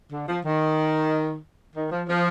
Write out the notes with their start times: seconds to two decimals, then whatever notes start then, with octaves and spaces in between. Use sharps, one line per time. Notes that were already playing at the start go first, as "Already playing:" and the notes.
0.13 D3
0.29 F3
0.45 D#3
1.76 D#3
1.92 F3
2.09 F3